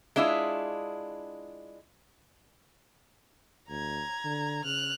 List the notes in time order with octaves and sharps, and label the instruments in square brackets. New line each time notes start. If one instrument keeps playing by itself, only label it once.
[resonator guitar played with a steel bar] G#3 D4 E4 F4
[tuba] D2 [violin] A#5 G#6
[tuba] D3
[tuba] C#3 [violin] F6 F#6